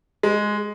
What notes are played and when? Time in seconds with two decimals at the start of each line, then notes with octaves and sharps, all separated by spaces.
0.23 G#3